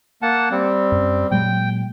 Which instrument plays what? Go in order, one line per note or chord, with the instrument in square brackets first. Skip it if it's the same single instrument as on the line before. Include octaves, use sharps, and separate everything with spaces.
[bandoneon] A#3 F#5 A5
G3 C4
[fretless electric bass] F#2
[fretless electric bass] A#2 F#3 G#3 [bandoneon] G5